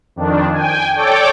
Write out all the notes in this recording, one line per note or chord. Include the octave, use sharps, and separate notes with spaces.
F2 D#3 D4
G5 G#5
A4 C#5 D5 G5 D6